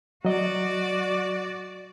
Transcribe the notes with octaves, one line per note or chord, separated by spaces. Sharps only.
F#3 F#4 D5 D#5